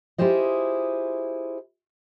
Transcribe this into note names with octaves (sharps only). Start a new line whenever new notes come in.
E4 F4 G4 G#4 C5 D#5